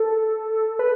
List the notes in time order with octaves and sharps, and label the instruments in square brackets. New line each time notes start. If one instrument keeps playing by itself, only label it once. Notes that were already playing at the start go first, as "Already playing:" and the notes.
Already playing: [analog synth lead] A4
B4